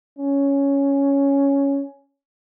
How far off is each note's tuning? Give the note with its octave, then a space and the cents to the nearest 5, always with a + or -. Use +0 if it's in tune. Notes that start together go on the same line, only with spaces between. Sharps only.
C#4 +5